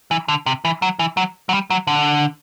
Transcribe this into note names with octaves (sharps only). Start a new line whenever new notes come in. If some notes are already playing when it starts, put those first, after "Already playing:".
E3
D3
C3
E3
F#3
E3
F#3
F#3
G3
F#3
D3